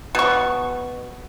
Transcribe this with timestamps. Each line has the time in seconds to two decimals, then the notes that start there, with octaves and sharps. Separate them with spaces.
0.15 B2 C#6